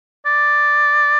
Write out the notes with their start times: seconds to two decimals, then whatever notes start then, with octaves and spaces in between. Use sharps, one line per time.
0.26 D5